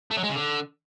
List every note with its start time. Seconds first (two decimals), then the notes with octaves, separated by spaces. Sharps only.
0.11 A3
0.17 F#3
0.23 G#3
0.30 C#3
0.36 D3